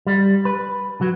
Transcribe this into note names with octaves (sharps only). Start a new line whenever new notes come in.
G3
B4
F#3